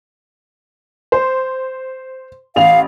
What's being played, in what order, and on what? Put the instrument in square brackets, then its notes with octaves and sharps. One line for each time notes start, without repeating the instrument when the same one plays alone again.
[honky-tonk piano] C5
[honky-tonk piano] A1 F7 [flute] F5